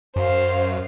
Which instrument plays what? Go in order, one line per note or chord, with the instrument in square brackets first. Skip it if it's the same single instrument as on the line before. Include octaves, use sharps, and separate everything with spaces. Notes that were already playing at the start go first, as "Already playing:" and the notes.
[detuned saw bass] F#2 [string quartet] C5 F5